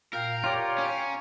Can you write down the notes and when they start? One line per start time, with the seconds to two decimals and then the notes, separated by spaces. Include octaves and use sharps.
0.13 A#2 A#4 F5 G5 G6
0.44 F4 G4 C#5 D5 F5 G5 A#5
0.78 C#4